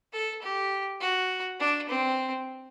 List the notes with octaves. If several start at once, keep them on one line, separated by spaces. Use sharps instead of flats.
A4
G4
F#4
D4
C4